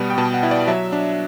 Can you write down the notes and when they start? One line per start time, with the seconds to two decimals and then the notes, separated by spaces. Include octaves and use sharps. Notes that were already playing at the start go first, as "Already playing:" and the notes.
Already playing: B2 G3 B3 B5
0.10 G5
0.18 B2 A5
0.34 F#5
0.43 E4
0.51 D5
0.68 F#3 E5
0.92 D4